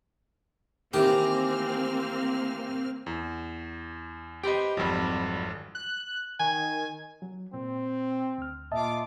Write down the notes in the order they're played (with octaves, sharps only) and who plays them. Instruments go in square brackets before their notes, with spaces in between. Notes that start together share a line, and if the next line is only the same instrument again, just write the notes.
[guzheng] D#3 [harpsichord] E3 G4 [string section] A#3 C4 F6
[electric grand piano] E2
[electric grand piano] G4 D#5 [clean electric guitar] B4 C5 G5
[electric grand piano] G#1 F2 [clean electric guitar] F#3 G3
[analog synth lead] F#6
[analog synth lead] D#3 [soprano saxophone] G#5
[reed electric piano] F#3
[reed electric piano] A#2 [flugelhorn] C4
[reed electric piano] D2 F6
[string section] A#2 F4 D6 [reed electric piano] D#5 E5 A5